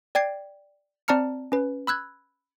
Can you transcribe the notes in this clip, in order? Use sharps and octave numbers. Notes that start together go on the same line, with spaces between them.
D5 G5 G#6 C7
C4 D5 A5 A#5 F6 C#7
C#4 B4
B5 E6 F#6 G#6